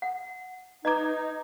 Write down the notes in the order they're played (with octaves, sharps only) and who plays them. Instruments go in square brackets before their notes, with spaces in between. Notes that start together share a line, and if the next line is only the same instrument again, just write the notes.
[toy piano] F#5
[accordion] D#4 [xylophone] B4 G#6 [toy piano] D#5 A#5 D6